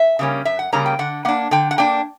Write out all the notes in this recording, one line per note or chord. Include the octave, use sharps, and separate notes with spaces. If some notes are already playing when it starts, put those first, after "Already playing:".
Already playing: E5
C#3 G3 A#3 C#4
F#2 E5
F#5
C#3 G3 A#3 C#4 A#5
G5
D3 F#5
A#3 D4 F#5
D3 G5
F#5
A#3 D4 G5